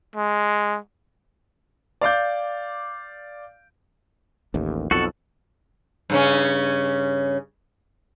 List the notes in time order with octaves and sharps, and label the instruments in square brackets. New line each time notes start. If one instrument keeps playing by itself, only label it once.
[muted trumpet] G#3
[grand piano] D5 F5 D6 G6
[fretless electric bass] A1 D#2
[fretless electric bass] B1 F2 [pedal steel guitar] F#4 A4
[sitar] G2 C#3 C#4